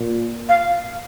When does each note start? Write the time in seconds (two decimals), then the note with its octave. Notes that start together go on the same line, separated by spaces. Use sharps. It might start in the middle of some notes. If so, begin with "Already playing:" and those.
Already playing: A#2
0.49 F5